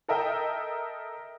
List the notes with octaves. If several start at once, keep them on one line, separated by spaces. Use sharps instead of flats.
A4 A#4 D#5 E5 G5